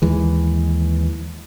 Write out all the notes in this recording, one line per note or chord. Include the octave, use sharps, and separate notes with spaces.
D#2 E3 G#3